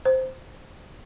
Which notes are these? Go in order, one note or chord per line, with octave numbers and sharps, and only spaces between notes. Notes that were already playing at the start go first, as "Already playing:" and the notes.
C5